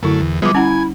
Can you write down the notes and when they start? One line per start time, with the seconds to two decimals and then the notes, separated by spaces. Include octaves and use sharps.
0.03 F#2 D3 A3 E4
0.21 E2
0.42 F3 G3 G#3 B3 D6
0.55 C#4 E4 F#5 G#5 A#5